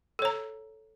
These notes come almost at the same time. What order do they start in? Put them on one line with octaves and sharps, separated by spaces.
A4 C#5 A#5